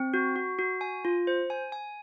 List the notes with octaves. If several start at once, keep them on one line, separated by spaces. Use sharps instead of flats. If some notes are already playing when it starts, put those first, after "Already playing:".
Already playing: C4
F#4
F#4
F#4
G#5
F4
C5
G#5
G#5